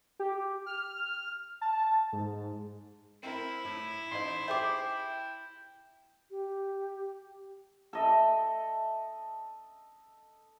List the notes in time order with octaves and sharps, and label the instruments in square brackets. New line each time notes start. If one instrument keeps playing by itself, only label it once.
[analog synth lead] G4
F6
A5
G#2
[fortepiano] C4 A#4 [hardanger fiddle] E4
[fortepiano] A2
[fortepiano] A1 D#4 C5 [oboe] C6
[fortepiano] G4 G#4 C5 [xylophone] E5 D6 [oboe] G5
[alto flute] G4
[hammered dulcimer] A4 D#5 E5